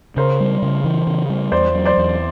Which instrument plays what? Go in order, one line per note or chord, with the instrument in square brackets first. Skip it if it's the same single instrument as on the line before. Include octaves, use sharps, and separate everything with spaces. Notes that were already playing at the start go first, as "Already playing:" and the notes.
[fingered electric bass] C#3 [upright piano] A#4 C5
[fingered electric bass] G3
C#3
E3
C#3
G3
[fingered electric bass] E2 [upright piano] C5 D5
[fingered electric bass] F#3
[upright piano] C5 D5
[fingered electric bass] E2